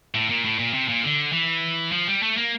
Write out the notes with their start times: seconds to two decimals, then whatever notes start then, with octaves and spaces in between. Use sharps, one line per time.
0.14 A2
0.30 A#2
0.45 A2
0.59 A#2
0.74 C3
0.89 A#2
1.03 D3
1.33 E3
1.92 F3
2.08 G3
2.23 A3
2.37 A#3